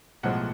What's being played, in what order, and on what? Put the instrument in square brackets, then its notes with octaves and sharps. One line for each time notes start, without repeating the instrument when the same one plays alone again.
[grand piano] B1 A2 F3 G#3 F#5